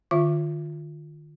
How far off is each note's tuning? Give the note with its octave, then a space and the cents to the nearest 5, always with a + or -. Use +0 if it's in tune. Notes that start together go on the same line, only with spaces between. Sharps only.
D#3 -45 F4 +0 E5 +30